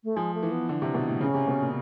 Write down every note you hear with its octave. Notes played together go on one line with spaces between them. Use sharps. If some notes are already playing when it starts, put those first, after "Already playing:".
A3
F3 G#3
A3
E3
B3
D3
C3
B2
A2
C#3 C#4
C3
B2
A#2